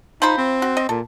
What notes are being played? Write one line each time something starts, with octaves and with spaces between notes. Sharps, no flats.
F3 D#4 C5 B5
C4
F#4
D#5
A#2 A4